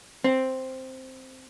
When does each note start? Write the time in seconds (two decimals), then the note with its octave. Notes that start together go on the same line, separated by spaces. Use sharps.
0.24 C4